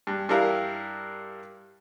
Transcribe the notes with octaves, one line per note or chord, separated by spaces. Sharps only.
G2
G2 G3 E4 A#4 F5